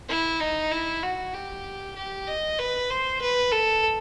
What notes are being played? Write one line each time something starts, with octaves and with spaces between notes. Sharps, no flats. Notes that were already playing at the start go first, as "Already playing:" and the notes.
E4
D#4
E4
F#4
G4
G4
D#5
B4
C5
B4
A4